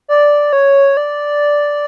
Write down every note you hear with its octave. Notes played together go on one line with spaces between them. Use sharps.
D5
C#5
D5